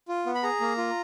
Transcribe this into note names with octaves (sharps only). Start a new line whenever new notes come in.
F4
B3
B5
G#4 A#5
A#3
F4